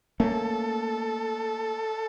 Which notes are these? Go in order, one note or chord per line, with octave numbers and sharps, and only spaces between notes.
A3 A#3 C#4 A4